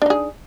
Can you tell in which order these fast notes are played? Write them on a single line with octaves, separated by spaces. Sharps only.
D4 D#4 G#4